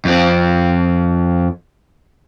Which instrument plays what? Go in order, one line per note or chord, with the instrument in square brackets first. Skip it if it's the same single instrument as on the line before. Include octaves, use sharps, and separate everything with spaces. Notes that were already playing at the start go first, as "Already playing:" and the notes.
[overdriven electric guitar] F2 C4